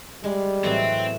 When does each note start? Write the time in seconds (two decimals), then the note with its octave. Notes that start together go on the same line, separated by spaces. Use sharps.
0.24 G3 G#3
0.64 A2 E3 F#3 C4